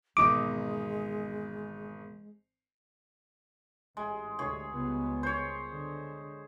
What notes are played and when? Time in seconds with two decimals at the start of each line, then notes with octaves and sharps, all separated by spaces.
0.17 G#1 E2 B2 G#3 D#4 D6 D#6
3.97 A1 G#3
4.39 D2 G#4 C#5
4.73 C#2 G3 B3
5.23 C5 C#5
5.70 D3